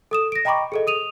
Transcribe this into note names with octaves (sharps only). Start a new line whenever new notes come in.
A4 D#6 E7
A#6 D7
D#5 G5 A#5 B5 C#6 D6
G#4 A4 D#5
D#6 D#7 F7